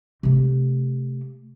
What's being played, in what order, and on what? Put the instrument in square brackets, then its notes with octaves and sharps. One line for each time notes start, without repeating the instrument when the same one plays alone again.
[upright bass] C3 A3